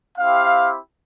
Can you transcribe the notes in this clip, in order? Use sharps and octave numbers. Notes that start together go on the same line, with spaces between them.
C4 E4 G4 F5